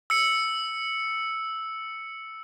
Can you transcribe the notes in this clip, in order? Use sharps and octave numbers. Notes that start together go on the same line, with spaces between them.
E6 C#7